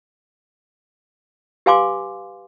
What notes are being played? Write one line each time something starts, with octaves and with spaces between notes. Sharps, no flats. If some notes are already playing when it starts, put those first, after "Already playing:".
G4 B4 F5 G#5 C6 D6